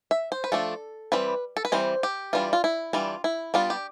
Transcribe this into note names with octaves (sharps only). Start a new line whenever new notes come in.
E5
C5
B4
F3 A3 D4 A4
E3 G3 C4 B4
A4
B4
E3 G3 C4 C5
G4
E3 G3 D4 F4
F4
E4
E3 G3 D4 F4
E4
G3 B3 D4 F4
G4